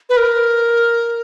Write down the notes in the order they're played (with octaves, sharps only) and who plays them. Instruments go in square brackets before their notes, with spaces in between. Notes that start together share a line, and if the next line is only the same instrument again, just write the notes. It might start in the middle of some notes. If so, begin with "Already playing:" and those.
[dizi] B4
A#4